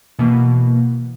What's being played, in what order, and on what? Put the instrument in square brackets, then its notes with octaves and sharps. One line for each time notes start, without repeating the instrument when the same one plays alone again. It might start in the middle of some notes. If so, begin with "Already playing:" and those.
[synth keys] B2 E3 A#3